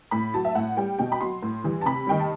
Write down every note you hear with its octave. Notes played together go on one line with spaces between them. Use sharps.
A2 B5
F#3 A5
E5
A2 F#5
G3 G5
B2 G5
B5
F#3 C6
A2
E3 G3
A5
C3 B5
D#3 G3 G5
A5